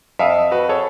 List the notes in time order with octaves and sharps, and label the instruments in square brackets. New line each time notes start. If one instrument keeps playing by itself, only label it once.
[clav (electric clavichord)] F2 [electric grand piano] E5 F5 D#6
[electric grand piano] F#4 B4
G#4 A4 C#5